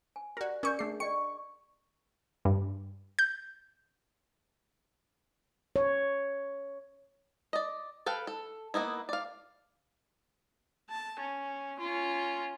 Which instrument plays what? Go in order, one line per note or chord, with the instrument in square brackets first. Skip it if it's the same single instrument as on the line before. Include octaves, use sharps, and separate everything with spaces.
[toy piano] G#5
[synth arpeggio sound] F#4 A#4 [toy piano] G4 D5
[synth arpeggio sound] C#4 C#6 G6 [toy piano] A#4 D5
[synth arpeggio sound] A3 C7 [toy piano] D4 G#4
[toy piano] D5 D#5 G5 [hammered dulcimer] C#6 [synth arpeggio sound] C#7
[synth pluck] G2
G6
[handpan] C#5
[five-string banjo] D5 D#5
A4 B4 F5 G5
A4
A#3 B3 D#4 E4
D5 F5
[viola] A5
C#4
C#4 F4